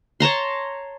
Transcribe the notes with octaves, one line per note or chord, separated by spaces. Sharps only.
C#5 A5 A#5 C6